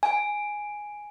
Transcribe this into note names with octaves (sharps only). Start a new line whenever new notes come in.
G#5